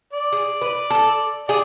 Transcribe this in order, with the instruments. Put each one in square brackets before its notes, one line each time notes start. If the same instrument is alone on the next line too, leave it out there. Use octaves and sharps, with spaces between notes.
[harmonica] D5
[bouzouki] G#4
B4
A4
[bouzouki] G#4 [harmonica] D5